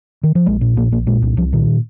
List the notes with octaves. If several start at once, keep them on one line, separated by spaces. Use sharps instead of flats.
D#3
F3
A#1 G#3
A#2
A#1 A#3
A#1 A#3
A#2 G#3
C2
C2 F3
A#2 D#3